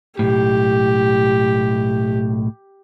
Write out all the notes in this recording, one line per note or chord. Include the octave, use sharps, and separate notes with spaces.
B1 A2 G4